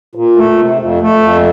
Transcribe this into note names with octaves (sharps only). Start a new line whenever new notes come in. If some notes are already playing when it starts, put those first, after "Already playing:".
A#2
A3
C3
F2
A3
F2